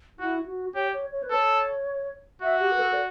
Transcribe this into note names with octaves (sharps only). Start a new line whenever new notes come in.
E4 F#4
F#4
G4 C#5
C#5
C#5
B4
A4 C#5
F#4 E5
G4
B4
A4
D5